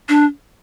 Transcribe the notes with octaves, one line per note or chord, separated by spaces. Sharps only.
D4